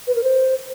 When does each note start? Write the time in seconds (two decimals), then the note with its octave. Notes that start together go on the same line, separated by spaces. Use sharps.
0.07 B4
0.15 A#4
0.23 C5